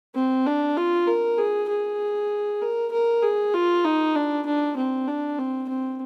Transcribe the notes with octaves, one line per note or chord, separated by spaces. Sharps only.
C4
D4
F4
A#4
G#4
G#4
A#4
A#4
G#4
F4
D#4
D4
D4
C4
D4
C4
C4